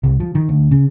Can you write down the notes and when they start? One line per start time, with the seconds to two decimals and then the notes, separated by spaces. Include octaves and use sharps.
0.03 C2
0.20 F3
0.35 D#3
0.49 D2
0.71 C#3